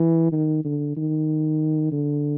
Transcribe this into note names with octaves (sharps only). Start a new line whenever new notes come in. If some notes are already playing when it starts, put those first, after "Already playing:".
Already playing: E3
D#3
D3
D#3
D3